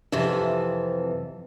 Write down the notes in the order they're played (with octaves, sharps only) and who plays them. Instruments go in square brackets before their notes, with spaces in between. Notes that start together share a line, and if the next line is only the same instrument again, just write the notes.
[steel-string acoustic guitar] F2 C3 E3 F3